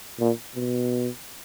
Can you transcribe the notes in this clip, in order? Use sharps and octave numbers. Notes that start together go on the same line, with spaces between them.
A#2
B2